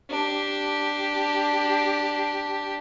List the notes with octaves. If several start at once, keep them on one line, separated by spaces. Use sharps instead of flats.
D4 G4